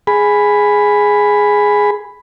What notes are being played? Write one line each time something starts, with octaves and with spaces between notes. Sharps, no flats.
G#4 B5